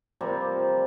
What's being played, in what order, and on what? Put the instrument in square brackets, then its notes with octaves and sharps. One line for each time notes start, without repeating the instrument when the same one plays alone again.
[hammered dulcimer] C3 F3 G3 A#3